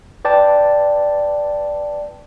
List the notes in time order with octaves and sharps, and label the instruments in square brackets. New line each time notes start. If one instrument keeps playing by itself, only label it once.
[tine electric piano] B4 D5 G5 A5